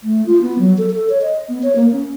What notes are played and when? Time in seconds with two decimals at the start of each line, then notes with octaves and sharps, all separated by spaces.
0.03 A3
0.26 F4
0.42 B3
0.59 F#3
0.78 A4
0.90 A4
1.10 C#5
1.22 D#5
1.49 B3
1.63 C#5
1.76 A#3
1.93 C#4